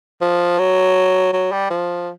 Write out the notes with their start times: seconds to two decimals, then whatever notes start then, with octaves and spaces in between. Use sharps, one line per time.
0.21 F3
0.59 F#3
1.33 F#3
1.52 G3
1.70 F3